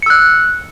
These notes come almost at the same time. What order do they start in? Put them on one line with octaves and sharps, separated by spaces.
C#7 E6 F#6